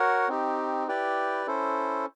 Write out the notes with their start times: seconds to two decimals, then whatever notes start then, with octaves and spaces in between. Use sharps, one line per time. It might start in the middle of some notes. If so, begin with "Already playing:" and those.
Already playing: F#4 A#4 C#5 F#5
0.28 C4 D#4 G4
0.88 E4 G4 B4 D5 G5
1.47 C#4 E4 A4 C5